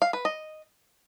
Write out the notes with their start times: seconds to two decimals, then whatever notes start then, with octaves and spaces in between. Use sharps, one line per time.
0.02 F5
0.13 B4
0.25 D#5